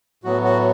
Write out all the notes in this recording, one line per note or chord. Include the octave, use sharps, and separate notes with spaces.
A2 F#3 B3 F#4
F#4